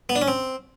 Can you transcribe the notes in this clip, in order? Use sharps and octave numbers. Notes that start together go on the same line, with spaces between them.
B3
D4
C#4
C4